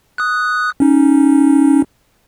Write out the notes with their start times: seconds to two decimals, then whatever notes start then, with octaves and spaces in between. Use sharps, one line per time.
0.18 D#6 F#6
0.80 C#4 D#4